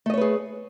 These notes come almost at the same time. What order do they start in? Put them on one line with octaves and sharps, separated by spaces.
A3 D#5 C#5 B4 G#4